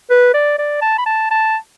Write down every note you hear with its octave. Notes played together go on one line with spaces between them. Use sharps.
B4
D5
D5
A5
B5
A5
A5